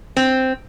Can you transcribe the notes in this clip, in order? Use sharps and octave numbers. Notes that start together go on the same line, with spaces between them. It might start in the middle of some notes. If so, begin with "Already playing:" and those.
C4